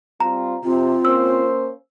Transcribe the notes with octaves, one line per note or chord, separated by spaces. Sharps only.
G3 C4 F4 A#5
C3 C4 F4
A#3 C#4 C5 E6